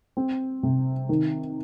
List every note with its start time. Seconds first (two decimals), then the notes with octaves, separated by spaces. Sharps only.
0.17 C4
0.63 C3
1.09 D#3